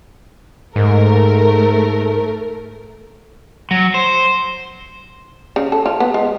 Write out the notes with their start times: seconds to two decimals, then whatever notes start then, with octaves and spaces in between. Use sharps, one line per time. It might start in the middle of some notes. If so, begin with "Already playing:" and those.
0.76 G#2 A3 A#4
3.71 F#3
3.94 C5
5.56 C#3
5.72 A4
5.86 F4
6.00 B3
6.14 G#3